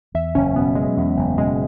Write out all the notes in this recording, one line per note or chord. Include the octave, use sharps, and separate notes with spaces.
E2 E5
F#1 C#4
B2 B3
F#3 G#3
E2
F#1
B2 G#3